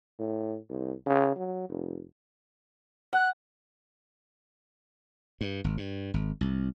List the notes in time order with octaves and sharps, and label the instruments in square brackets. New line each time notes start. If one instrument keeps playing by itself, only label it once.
[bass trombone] A2
C2
C#3
F#3
F1
[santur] F#5 [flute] F#6
[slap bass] G2
G#1
G2
G#1
C2